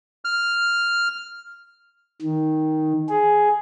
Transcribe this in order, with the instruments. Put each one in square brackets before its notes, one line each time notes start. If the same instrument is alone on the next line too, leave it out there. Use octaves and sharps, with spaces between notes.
[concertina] F6
[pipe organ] D#3
G#4